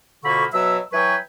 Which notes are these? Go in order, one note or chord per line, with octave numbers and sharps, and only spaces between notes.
F2 B2 D3 A#3 B5 C#6
B2 F#3 E5 E6
E3 F#3 B4 G5 G#5 C#6